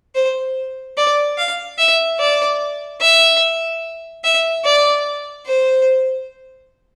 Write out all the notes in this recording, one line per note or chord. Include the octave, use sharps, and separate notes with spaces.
C5
D5
F5
E5
D5
E5
E5
D5
C5